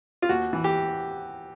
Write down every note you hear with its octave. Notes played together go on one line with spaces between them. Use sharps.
F4
D#2 F#4
E3
G4